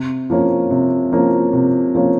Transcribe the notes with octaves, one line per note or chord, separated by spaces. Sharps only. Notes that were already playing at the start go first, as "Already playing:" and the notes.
Already playing: C3
F3 A#3 C#4
C3
F3 A#3 C#4
C3
F3 A#3 C#4